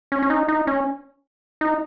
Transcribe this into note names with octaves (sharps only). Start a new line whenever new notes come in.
C#4
C#4
D#4
D#4
C#4
D#4